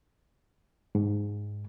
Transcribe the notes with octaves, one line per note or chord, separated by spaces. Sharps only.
G#2